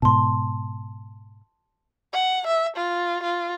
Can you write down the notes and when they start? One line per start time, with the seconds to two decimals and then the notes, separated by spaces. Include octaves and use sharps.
0.02 G#2 B2 A5 C6
2.13 F#5
2.47 E5
2.77 F4
3.23 F4